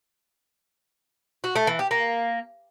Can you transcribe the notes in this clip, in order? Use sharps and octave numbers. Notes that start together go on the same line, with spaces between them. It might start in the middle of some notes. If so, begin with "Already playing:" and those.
F#4
A3
E3
G4
A#3